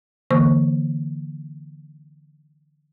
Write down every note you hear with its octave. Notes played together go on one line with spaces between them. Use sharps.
D3 E3 A#3 C5 C#6